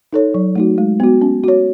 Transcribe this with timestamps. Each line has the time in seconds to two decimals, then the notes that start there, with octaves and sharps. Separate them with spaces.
0.13 D#4 A4 C#5
0.34 F#3
0.55 A3 D#4 F#4
0.78 G#3
1.00 B3 F#4
1.21 C#4
1.44 F#4 C#5